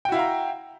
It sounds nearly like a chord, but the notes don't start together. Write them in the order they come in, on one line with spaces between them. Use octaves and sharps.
G5 F#4 E4 F5 A#5